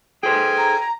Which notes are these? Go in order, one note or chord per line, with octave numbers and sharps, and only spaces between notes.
G#4 A4 C5 G5 G#5
A#5